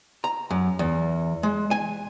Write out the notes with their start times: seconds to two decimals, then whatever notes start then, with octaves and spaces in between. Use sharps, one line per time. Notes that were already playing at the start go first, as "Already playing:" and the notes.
0.24 A#5
0.50 F#2
0.79 E2
1.43 G#3
1.71 G#5